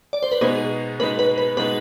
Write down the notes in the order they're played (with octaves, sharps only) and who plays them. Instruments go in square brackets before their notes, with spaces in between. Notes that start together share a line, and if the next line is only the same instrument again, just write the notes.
[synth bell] D5
C5
B4
[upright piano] B2 G#3 B3 D#4 [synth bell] G#4
[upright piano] B2 G#3 B3 D#4 [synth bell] B4
[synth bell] B4
B4
[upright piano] B2 G#3 B3 D#4 [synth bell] B4